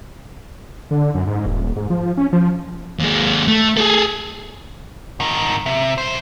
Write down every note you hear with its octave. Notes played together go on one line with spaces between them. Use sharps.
D3
F#2
G#2
D#1
G#2
F3
C#4
F3
D#2 G#3
A3
G#4 A4
G#2 D#3
C3
B1 C5